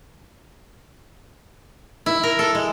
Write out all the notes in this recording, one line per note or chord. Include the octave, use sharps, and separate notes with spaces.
E4
A#4
A4
G#3